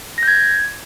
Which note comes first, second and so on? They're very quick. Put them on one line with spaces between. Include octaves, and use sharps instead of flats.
A#6 G6 G#6